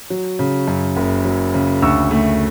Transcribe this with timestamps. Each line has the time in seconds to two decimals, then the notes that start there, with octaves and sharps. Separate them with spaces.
0.10 F#3
0.39 C#3
0.68 F#2
0.97 F#1
1.25 F#3
1.54 C#3
1.82 D2 C#6 E6
2.11 A3